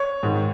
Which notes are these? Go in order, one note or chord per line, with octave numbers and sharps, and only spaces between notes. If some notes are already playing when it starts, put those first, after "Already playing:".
Already playing: C#5
G#2 D#3